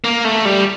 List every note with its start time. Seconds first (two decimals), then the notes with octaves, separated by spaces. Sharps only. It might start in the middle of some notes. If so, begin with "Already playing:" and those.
0.04 A#3
0.25 A3
0.45 G3